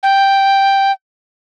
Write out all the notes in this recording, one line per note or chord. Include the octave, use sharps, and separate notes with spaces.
G5